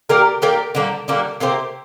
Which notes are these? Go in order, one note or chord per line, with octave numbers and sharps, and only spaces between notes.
A#3 G4 A#4 D5
A#3 G4 A#4 D5
D3 G3 A#3 D4
D3 G3 A#3 D4
C3 A#3 G4 C5